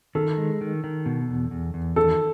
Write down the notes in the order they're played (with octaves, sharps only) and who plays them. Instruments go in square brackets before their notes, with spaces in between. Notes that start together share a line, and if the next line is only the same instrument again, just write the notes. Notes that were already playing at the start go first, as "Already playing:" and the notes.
[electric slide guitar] D#3 [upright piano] A4
[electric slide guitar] G#3
D#3
D#3
B2
E2
E2
E2
[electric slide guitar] D#3 [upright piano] A4